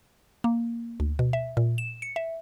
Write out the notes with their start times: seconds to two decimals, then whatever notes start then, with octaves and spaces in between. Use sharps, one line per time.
0.44 A#3
1.00 D2
1.19 B2
1.33 E5
1.57 A#2
1.78 E7
2.02 C#7
2.16 E5